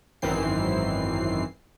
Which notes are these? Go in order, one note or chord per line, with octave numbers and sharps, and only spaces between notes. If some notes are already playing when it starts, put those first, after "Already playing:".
G#1 F#2 D#3 E3 C4 C7